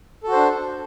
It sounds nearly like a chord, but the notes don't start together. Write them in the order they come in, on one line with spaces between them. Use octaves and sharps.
A4 F#4 C5 D4